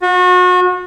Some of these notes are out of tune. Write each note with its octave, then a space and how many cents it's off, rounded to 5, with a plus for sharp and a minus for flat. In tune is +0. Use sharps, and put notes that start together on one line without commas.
F#4 -35